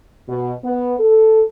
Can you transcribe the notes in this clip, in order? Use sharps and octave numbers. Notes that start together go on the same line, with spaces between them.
B2
B3
A4